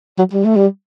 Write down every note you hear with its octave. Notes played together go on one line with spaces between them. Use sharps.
F#3
G3
A3
G3